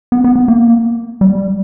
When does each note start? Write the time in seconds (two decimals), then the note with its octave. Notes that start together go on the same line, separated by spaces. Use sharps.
0.12 B3
0.24 B3
0.36 B3
0.48 A#3
1.21 G3